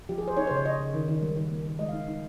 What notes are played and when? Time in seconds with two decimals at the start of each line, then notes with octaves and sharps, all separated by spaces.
0.09 F3 G4
0.18 G#4
0.23 F3 C5
0.37 D#4 C#5
0.47 C#3 C5
0.56 C#5
0.65 C#3 D#5
0.80 C#3
0.94 D#3
1.08 D#3
1.23 G3
1.37 D#3
1.51 A#3
1.66 D#3
1.79 G#3 D#5
1.89 D#4 F5
2.08 D#4